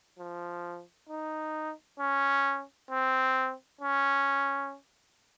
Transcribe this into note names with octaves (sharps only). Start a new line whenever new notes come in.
F3
D#4
C#4
C4
C#4